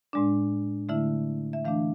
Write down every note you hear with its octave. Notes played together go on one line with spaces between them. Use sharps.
A2 G#3 D4 D5
D3 A3 E4 E5
E5
E3 A3 D4 F5